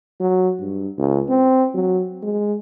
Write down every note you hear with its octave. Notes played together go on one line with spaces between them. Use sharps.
F#3
G2
C#2
C4
F#3
G#3